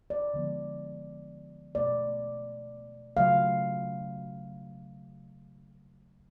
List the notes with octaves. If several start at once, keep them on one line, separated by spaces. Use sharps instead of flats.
D5
D3 F3 G#3 B3
B2 A3 D5
C#3 F#3 A3 F5